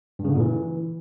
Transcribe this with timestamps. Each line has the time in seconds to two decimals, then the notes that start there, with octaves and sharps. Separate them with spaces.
0.19 G2
0.24 C#3
0.30 D3
0.35 A#2
0.40 E3